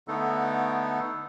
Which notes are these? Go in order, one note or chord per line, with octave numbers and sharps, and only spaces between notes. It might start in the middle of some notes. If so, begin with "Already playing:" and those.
D3 A3 B3 D#4 A4